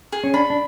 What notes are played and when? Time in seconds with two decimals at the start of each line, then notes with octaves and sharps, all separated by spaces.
0.12 G#4
0.24 C#4
0.34 D4 B5
0.50 D4